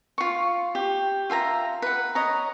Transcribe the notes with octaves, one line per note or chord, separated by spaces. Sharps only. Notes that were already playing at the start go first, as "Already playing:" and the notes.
F4 C#6
G4
F4 E5 G#5 A#5
B4 F#5
C#5 D#5 A#5